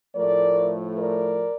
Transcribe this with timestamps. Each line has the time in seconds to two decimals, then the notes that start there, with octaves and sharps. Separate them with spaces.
0.15 A2 F3 A3 A#4 D5
0.98 A#4 D5